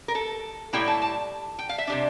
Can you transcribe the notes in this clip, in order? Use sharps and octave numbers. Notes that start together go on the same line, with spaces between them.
A#4
A4
A2 G3 A#3 E4 G5
A5
A5
G5
F5
E5
C3 G3 D4